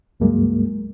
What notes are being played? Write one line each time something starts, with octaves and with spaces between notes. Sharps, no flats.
C#2 G2 F#3 G#3 A#3